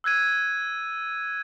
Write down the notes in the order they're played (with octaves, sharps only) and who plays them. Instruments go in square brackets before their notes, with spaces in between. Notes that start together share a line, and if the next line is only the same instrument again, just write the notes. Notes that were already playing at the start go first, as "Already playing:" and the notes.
[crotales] E6 F#6 G#6 D#7